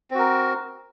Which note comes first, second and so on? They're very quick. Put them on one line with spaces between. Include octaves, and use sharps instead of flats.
C4 F#4 A#4